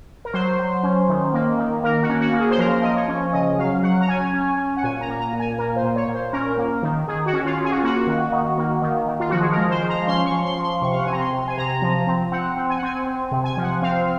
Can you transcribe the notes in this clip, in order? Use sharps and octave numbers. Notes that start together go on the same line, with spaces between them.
A#4
F#3 C5
F#3
C#4
D#3
A#3
D#3
A#3 A#4
F#4
C#4
F#4
A#3
G#4
C5
F3 A#4
F3 D#5
C#5
C#4
C#3 D#5
F#3 F5
F#3 F#5
A#5
C#4 G#5
C#4
C#4
F#5
A#2 G#5
A#5
A#3
A#5
A#2
G#5
A#3 A#4
C5
A#2
C#5
A#2
C5
C#4 A#4
A#3
D#3
D#3 G#4
F#4
C#4
F4
C#4
G#4
F#4
F4
A#3 F#4
D#3
D#3
A#3
D#3
D#3
F4
F3 F#4
G#4
A#4
G#3
C5
F3
A#5
C#4 C6
C#6
F3
C6
F3
C6
C3 C#6
F5
F#5
C4 G#5
A#5
C6
C3
G#5
C3 A#5
F3
C4
C4 F#5
C4
G#5
F#5
C4 G#5
C4
C3
G#5
F3
F#5
C4 F5